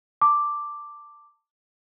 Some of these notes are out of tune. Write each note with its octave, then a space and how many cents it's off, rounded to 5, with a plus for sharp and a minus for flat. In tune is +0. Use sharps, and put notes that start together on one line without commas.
A5 +30 D6 +0